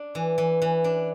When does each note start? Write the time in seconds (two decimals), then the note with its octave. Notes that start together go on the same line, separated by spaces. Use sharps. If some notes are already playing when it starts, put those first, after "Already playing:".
Already playing: D4
0.15 E3
0.38 E3
0.62 E3
0.84 D4